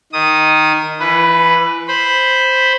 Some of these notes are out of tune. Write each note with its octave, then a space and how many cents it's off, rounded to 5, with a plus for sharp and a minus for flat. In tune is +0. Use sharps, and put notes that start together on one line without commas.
D#3 +0 D#6 +0
E3 +30 B4 +0
C5 +0 B5 +0